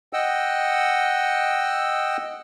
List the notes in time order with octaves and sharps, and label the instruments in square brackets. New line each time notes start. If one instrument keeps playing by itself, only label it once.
[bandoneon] D#5 F#5 G5 E6